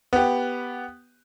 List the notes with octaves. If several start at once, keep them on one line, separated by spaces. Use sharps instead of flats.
B3 G4